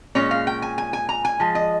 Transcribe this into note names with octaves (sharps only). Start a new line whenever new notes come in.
A#2 G#3 C#4 C#5
F5
G5
G#5
G#5
G#5
A#5
G#5
F3 G#3
D#5